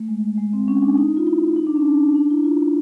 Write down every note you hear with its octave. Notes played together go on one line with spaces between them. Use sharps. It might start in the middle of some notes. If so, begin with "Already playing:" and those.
Already playing: A3
G#3
G#3
C4
C#4
D4
D#4
F4
E4
D#4
D4
C#4
D4
D4
E4
F4
E4